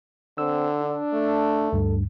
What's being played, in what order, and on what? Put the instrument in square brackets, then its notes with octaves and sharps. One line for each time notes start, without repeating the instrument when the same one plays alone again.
[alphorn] D3 [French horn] C4 [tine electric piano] E6
[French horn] D4
[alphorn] A3
[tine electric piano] D2 G2 [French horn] A4